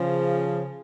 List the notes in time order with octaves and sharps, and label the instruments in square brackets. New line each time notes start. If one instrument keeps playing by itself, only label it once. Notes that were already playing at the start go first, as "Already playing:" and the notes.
Already playing: [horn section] C#3 F3